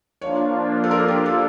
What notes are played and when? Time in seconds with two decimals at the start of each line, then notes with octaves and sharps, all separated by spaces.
0.21 F3 A#3 D4 F4 C#5
0.84 A4
0.91 A#4
1.08 G4
1.26 A4